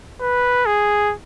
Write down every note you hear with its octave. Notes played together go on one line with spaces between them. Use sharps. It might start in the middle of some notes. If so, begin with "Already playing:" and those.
B4
G#4